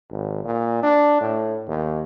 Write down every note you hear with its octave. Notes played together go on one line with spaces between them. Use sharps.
G#1
A#2
D4
A2
D#2